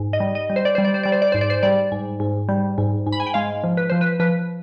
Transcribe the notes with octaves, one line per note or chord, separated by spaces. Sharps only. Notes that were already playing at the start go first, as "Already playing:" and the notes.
Already playing: G#2
D#5
G3
D#5
G3
C5
D5
G3 C5
D5
C5
G3 D5
C5
D5
G#2 C5
D5
C5
G3 D5
G#2
G#2
G3
G#2
G#2
B5
G#5
G5
G#3 F5
F3
B4
F3 C5
B4
F3 B4